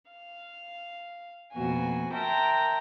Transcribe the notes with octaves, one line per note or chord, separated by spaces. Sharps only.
F5
F2 B2 A#3 F#4 G#5
A#4 E5 G5 A5 A#5 C6